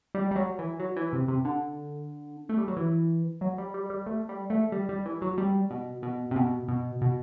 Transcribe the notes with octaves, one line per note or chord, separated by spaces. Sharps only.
G3
G3
F#3
E3
F#3
E3
C3
C3
D3
A3
G3
F#3
E3
F#3
G3
G3
G3
A3
G3
A3
G3
G3
E3
F#3
G3
B2
B2
C3
B2
B2
B2